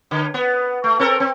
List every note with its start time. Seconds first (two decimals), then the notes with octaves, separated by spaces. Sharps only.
0.11 D3
0.34 B3
0.84 A3
0.99 C4 A4 A#4
1.20 C4